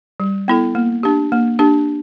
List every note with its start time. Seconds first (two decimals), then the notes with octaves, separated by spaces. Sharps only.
0.20 G3
0.48 B3 E4 A4
0.75 A#3
1.03 D4 G4
1.32 A#3
1.59 D4 G4